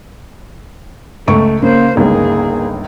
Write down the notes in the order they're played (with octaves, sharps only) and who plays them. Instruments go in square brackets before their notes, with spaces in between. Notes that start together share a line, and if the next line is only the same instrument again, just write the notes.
[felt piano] C#2 C#6 D7 [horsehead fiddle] A3
[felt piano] C#3 [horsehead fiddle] A#3 C5
[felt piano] G1 C#2 D#3 [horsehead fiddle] A#3 G#4